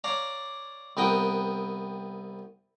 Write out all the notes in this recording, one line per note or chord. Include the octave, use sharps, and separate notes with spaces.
C#5 D5 F5 A#5
C2 B3 A#4 G5 D#6